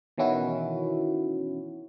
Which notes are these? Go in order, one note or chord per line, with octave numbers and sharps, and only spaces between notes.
B2 D#3 E3 C#4 E4 F#4